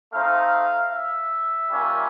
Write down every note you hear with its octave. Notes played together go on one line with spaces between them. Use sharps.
A3 C4 D#4 F5
E5
G3 A#3 C#4 F4